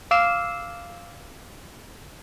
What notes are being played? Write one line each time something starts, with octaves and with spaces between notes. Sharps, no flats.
F5 D6 E6 F6 C7 E7